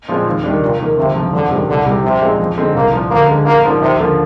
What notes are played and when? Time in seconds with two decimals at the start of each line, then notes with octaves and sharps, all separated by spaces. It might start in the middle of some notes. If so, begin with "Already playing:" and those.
0.08 A#2 F3 G#3 C4
0.26 D#2
0.44 D#3 G3 D4
0.61 F1 A#2
0.80 D#2 D#3 A#3
0.97 G1 C3
1.15 F2 C3 F3
1.33 F2 D3
1.51 C3 D#3 G3 D4
1.68 C2 D3
1.86 C3 G3
2.04 A#1 C3
2.22 A#2 G#3 C4 D#4
2.40 F2
2.57 D3 G#3 C4 D#4
2.75 C2 A#3
2.93 A#2 F3
3.11 D2 A#3
3.28 D3 G#3
3.46 A#1 A#3
3.63 G#2 F3 A#3 D4
3.81 D#2 C3
4.00 D3 F3 A#3